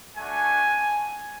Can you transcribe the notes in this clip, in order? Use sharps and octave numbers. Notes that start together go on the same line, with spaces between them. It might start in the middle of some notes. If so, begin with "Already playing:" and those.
A3 D4 F#4 G#5